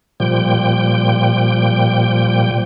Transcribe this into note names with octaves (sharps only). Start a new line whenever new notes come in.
A#2 F3 G3 G5